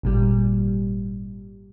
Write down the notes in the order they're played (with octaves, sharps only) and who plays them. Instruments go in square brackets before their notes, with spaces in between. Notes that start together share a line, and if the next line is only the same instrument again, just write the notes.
[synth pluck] G#1 A#2 G3